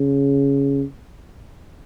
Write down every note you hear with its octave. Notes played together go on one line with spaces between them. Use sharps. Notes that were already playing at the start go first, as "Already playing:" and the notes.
Already playing: C#3